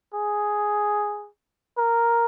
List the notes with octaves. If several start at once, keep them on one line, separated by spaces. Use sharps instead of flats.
G#4
A#4